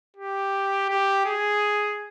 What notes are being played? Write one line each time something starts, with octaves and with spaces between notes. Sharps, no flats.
G4
G4
G#4